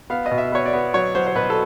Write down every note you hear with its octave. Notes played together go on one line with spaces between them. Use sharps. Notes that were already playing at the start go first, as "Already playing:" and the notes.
B3 F5
D#5
B2
E5
B3 C#5
D5
B3
F#3 C#5
F#3 C5
C5
B2 B4
A4